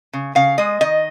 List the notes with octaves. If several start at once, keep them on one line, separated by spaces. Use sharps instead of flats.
C#3
C#3 F5
G#3 D#5
D#3 D#5